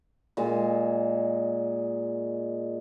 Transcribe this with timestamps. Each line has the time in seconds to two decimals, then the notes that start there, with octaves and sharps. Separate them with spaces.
0.37 A#2 G#3